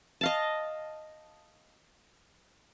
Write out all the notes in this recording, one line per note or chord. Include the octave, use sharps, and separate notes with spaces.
D#5 F5 A5